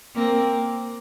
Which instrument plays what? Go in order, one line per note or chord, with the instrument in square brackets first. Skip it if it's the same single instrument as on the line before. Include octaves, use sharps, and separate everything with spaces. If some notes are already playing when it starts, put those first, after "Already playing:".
[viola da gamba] A#3 C4